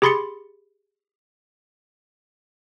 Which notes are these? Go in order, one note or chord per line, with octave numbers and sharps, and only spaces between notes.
G4 G#4 B5 C6 A6 C#7